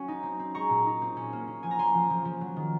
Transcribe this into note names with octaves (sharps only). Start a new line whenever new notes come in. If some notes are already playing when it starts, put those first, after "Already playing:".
Already playing: F#3 C#4
D#4
C4
C4
G#3 A#5 C#6
A#2
D#4
C4
C#4
A#3
C#4
F3 G#5
A#5
C#4 G#5 C6
F3
F3
F3
F#3
D#3